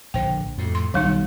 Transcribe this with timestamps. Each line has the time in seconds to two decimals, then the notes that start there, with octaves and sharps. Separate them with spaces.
0.14 A#1 D3 C5 G5
0.58 F2 A2
0.75 C6
0.94 B1 D#3 G3 D#4